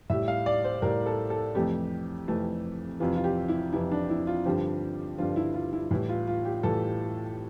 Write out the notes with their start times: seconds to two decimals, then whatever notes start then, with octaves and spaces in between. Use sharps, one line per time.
0.10 A2 G3 E5
0.28 F5
0.46 D5
0.64 C5
0.82 A2 G3 A#4
1.06 A4
1.30 A4
1.55 F2 C3 E3 A3 G4
2.28 F2 C3 E3 A3
3.00 F2 C3 E3 F4
3.16 F4
3.24 G4
3.48 E4
3.73 F2 C3 E3 E4
3.92 D4
4.09 E4
4.27 F4
4.46 G2 D3 F3 G4
5.18 G2 D3 F3 F4
5.36 E4
5.54 F4
5.73 E4
5.91 A2 E3 G3 E4
6.09 F4
6.27 F4
6.45 G4
6.63 A2 E3 G3 A4